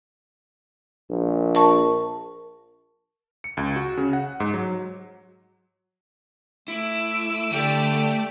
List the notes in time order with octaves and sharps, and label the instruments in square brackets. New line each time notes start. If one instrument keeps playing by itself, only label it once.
[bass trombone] A#1
[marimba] A#4 A5 C#6
[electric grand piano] C#7
C#2
F#4
C#3
F#5
G#2
F#3
[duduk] A3 [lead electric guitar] E4 [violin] D6 E6
[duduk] D3 [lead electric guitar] A3 [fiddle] G4 D5